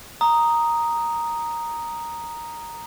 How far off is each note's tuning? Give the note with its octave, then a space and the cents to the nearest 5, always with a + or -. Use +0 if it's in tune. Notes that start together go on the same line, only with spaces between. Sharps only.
A#5 +0 D#6 +0